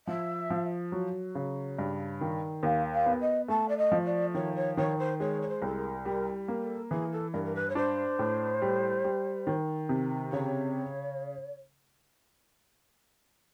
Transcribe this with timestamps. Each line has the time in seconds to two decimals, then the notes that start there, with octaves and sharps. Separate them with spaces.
0.07 F3 E5
0.50 F3
0.92 F#3
1.35 C#3
1.79 G2
2.21 D#3
2.63 D#2 F5
2.92 F5
3.06 B3
3.20 D#5
3.48 A3 A5
3.68 D5
3.77 D#5
3.92 F3
4.06 D5
4.34 D#3 C#5
4.55 C#5
4.77 D#3 C#5
4.98 C5
5.20 G#3 C#5
5.42 C#5
5.48 C5
5.62 C2 A4
5.76 A#4
6.05 G3 A#4
6.48 A#3
6.62 A4
6.90 E3 G#4
7.12 A4
7.33 G2 A#4
7.44 A#4
7.55 B4
7.69 C#5
7.75 D4 C5
8.19 A2
8.62 G3
9.04 G3
9.47 D#3
9.89 C3
10.32 C#3 C#5